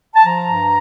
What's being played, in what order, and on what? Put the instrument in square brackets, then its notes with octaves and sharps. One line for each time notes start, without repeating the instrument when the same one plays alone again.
[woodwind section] A5
F3 A#5
G2